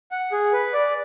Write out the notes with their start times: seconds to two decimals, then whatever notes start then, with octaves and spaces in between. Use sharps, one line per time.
0.11 F#5
0.32 G#4
0.53 B4
0.73 D5